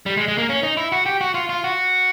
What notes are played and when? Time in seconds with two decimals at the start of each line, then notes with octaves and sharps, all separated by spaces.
0.06 G3
0.17 G#3
0.28 G#3
0.38 A#3
0.49 C#4
0.63 D#4
0.77 E4
0.92 F#4
1.06 G4
1.21 F#4
1.34 F4
1.49 F4
1.64 F#4